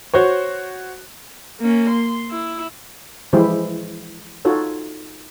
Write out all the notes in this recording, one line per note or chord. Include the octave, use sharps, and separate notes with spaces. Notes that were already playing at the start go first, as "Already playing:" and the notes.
F#4 C5 C#5
A#3 C#4
C6
E4
E3 F3 G#3 E4 G4 C5
D#4 F4 F#4 A4 C#5